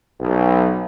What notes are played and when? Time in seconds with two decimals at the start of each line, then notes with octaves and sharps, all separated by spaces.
0.20 B1